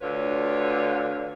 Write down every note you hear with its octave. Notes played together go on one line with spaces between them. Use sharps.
D2 D3 F4 B4 C#5